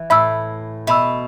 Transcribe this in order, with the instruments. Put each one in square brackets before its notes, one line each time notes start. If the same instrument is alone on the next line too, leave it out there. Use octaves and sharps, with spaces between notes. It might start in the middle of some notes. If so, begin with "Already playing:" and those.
Already playing: [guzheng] E3
[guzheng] A2 [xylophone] E5 B5 E6
[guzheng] B2 [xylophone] E5 B5 E6